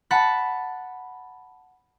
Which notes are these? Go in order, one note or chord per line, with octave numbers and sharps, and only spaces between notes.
F#5 A5 B5